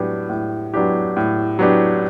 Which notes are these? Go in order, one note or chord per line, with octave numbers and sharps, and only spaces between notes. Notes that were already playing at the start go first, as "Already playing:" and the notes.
Already playing: A2 F#3 B3 D4 G4
A2
F#3 B3 D4 G4
A2
F#3 B3 D4 G4